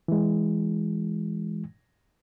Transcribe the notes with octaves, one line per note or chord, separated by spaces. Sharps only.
E3 G#3